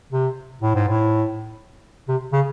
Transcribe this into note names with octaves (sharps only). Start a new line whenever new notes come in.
C3
A2
G#2
A2
C3
C#3